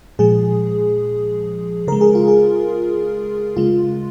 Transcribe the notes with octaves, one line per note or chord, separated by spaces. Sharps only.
A#2 F3 G#3 G#4
C#3 G#3 A#4
G#4
F4
G#4
C#3 G#3 F4